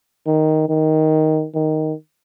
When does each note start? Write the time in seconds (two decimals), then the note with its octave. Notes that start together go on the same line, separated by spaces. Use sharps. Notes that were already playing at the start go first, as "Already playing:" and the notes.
0.26 D#3
0.69 D#3
1.55 D#3